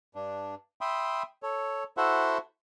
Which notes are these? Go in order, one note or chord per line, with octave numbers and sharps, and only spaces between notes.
G2 D4
E5 G5 B5 C6 D#6
A4 C#5
E4 F#4 A4 C5 E5 F#5